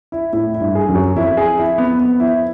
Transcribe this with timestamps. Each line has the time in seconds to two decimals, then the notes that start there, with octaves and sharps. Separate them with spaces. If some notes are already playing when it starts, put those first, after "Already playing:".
0.12 E4
0.33 A2 E4
0.54 E4
0.60 G2
0.75 G#4
0.88 F#2
0.95 F#3
1.16 F2 E4
1.37 G#4
1.58 E4
1.78 B3
1.99 B3
2.20 E4